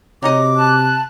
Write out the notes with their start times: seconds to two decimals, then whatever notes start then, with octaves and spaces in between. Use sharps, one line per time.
0.23 C3 F#3 D#4 D#5 D6
0.55 A5 F#6